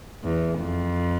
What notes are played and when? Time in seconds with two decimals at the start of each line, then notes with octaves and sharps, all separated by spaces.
0.24 E2
0.60 F2